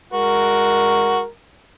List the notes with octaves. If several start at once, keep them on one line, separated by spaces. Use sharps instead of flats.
G#3 F#4 A#4